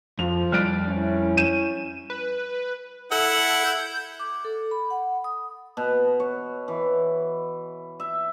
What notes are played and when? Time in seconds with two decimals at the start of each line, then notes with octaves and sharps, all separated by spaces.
0.19 F2 F3 F7
0.52 F2 G3 D5 F6 F#6 D7
0.86 C#4 E4
1.37 G6 D#7 E7
2.10 B4
3.12 E4 A4 F#5
3.64 G6
4.20 D6
4.45 A4
4.71 B5
4.90 F#5
5.24 D#6
5.77 B2
6.20 C#5
6.68 E3
8.00 E5